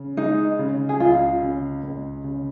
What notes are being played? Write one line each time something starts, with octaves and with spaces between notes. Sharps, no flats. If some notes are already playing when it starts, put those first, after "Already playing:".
Already playing: C#3
G#3 D#4
C#3
G#4
C#2 F4
C#3
C#2
C#3